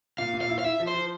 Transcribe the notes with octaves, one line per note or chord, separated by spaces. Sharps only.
A#2 F5
A#2
F5
E4
F5
E4 E5
F3
C5
F3